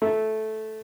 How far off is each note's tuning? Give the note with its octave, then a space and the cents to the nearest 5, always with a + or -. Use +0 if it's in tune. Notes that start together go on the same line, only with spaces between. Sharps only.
A3 -10